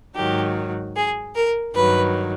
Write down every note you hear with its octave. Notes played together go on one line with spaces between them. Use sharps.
G#2 D#3 F#3 G4
G#4
A#4
G2 D#3 F#3 B4